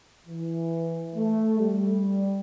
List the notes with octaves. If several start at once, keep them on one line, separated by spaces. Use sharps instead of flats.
E3
A3
G3